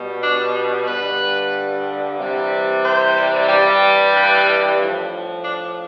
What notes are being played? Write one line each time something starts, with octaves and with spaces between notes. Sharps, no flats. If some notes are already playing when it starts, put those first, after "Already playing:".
Already playing: B2 G3
D4
G2 D3 G3 B4
C3 E3 G3
C5
G2 E3 G3
B4
A2 F3
D4